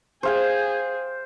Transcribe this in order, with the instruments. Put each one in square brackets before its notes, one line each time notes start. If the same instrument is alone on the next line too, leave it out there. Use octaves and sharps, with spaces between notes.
[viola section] G#4 [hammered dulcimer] C5 F5 G5